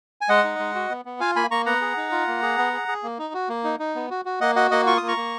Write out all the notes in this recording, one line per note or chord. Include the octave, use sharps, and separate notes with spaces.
G#5
G#3 D#5 F#5
D#4
G#3
F#4
B3
B3
F4 F5 G#5
A#3 G#5 B5
A#3 A#5 C#6
B3 F#5 A#5
G#4
D#4
F4
A#3
G#4
B3
G#4
G#4
A#3
D#4
F#4
A#3
D#4
D#4
B3
F#4
F#4
A#3 D#5 F#5
F#4 D#5 F#5
A#3 D#5 F#5
F4 C#6
A#3 D#6
A#5 C#6
A#3